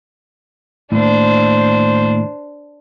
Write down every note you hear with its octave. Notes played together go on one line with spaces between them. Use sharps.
D#2 A2 D4 C5